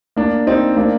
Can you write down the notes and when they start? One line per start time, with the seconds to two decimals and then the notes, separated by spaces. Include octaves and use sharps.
0.16 A#3 D4
0.47 C4 D#4
0.77 A#3 D4